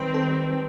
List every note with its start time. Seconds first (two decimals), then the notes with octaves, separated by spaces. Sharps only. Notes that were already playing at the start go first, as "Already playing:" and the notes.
Already playing: D#3 G3 C4 B4
0.14 A4